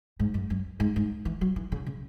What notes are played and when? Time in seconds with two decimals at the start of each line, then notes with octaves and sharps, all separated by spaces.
0.20 G#2
0.34 F#2
0.50 F#2
0.80 G#2
0.96 G#2
1.25 E3
1.41 F#3
1.56 E3
1.72 C#3
1.86 C#3